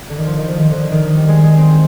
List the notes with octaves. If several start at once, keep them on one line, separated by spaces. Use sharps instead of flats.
D3
D#3
F3
D#3
F3
D#3
D3
D#3
G3
G#3
G#3
C4